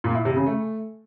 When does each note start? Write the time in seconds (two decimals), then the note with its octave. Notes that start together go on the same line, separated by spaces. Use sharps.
0.04 A#2
0.15 E4
0.25 C3
0.36 C#3
0.46 A3